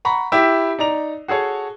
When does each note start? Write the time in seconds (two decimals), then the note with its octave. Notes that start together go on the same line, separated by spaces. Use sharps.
0.05 F#5 A#5 B5 C#6
0.32 E4 G4 E5
0.79 D#4 D5 A#5 F7
1.28 F#4 G#4 A4 C#5